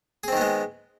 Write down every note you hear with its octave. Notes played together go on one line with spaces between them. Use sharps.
D#3 G#3 B3 C4 G#4